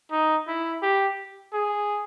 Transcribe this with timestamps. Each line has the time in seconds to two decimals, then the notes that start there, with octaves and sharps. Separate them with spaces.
0.11 D#4
0.47 E4
0.82 G4
1.53 G#4